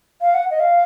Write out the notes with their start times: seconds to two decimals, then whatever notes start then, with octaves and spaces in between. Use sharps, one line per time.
0.21 F5
0.34 F#5
0.50 D#5
0.60 F5